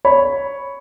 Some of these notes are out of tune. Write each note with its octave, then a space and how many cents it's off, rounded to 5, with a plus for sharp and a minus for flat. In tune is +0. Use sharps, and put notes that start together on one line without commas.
C#5 +0 B5 +0